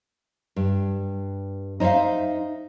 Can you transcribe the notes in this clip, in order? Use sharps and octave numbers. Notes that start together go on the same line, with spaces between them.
G2
D#4 C5 C#5 E5 F5